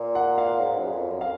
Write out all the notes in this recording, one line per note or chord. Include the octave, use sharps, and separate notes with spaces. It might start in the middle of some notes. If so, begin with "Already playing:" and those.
Already playing: A#2
F#5
F5
G#2
F#2
F2
F#2
F5